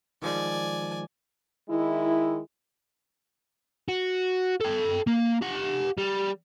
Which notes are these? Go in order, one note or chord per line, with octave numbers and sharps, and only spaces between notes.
D#3 F3 G#3 D5 G#5
D#3 G#3 E4
F#4
A4 G5
A#3
G4 F#5
G3